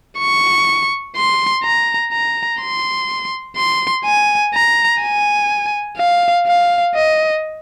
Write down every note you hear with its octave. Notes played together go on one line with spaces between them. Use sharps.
C#6
C6
A#5
A#5
C6
C6
G#5
A#5
G#5
F5
F5
D#5